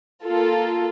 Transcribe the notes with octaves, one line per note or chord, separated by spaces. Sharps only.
A#3 F4 A4